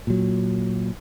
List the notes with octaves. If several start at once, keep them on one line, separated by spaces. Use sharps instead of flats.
A#2 F#3